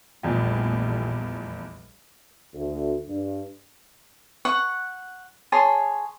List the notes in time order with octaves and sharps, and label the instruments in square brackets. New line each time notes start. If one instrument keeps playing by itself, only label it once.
[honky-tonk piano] F1 E2 F3 [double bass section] A#1 G3 A3
[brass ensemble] D2
G2
[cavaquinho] F#5 C#6
G#4 C#5 A5 C6